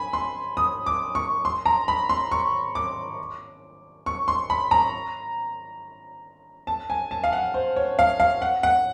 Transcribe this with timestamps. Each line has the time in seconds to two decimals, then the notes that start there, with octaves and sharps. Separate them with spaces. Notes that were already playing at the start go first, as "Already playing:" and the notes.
Already playing: G#5 B5
0.13 C6
0.57 D#6
0.86 D6
1.15 C#6
1.45 C6
1.66 A#5
1.88 B5
2.09 C6
2.31 C#6
2.75 D6
4.06 C#6
4.28 C6
4.50 B5
4.71 A#5
6.67 A5
6.90 G#5
7.11 A5
7.24 F5
7.33 F#5
7.54 C5
7.76 C#5
7.99 F5
8.20 F5
8.42 F#5
8.63 F#5